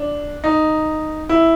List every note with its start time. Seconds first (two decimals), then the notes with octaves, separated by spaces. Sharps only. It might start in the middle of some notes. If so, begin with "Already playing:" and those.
Already playing: D4
0.44 D#4
1.29 E4